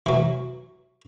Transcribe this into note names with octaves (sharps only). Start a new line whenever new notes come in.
E3 F#3